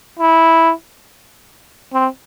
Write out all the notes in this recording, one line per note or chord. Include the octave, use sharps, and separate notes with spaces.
E4
C4